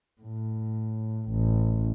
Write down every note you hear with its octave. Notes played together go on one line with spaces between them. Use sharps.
A2
A1